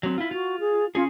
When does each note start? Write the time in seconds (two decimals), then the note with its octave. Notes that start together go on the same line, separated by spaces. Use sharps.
0.03 F#3 C4
0.18 E4 F4
0.31 F4 F#4
0.60 G#4
0.95 C#4 F4 G#4